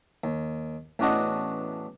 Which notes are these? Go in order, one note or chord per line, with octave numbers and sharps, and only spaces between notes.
D#2
A1 E2 C#4 D4 F#4 D#5